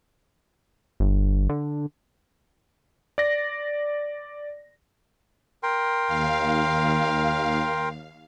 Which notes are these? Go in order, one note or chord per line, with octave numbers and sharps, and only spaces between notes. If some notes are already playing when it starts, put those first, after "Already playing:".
G1
D3
D5 A#6
A#4 G5 C6
D#2 F5